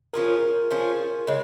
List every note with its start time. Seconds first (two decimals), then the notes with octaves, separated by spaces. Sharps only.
0.13 F3 C#4 F4 G#4 A#4
0.71 F3 C#4 F4 G#4
1.27 C#3 G#3 C#5